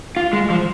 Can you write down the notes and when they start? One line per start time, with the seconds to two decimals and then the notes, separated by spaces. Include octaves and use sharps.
0.17 F4
0.33 G#3
0.50 F3